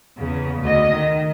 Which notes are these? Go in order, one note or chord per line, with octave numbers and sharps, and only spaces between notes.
E2 C#3
D2 D#5
D#3